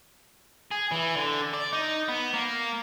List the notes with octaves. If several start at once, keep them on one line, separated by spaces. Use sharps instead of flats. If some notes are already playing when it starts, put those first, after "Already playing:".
G#4
E3
D3
D5
D#4
B3
A#3